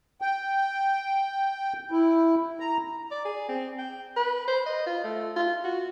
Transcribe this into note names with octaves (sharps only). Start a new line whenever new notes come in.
G5
E4
A#5
D5
G#4
C4
G5
B4
C5
D#5
F4
A3
F4
F#4